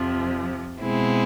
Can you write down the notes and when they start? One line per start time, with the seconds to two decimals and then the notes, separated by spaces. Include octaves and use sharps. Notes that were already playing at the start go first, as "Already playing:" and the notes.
Already playing: F2 C3 F3
0.81 B2 G#3 C4 E4